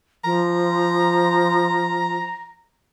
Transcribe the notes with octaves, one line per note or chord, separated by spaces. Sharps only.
F3 A#5